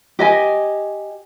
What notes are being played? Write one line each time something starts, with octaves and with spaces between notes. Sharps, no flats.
G4 D#5 G#5